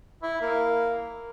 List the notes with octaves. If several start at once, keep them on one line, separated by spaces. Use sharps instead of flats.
E4
A#3